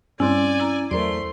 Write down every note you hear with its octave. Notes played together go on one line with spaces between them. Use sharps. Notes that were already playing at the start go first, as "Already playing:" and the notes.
G2 G3 C4 C#4 E4 D5 G#5 C6
E4 A#5
E2 F#3 A3 A#4 C5 D5 C6